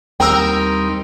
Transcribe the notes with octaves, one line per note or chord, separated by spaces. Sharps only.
D#2 G3 C4 D#4 A#4 G5 E6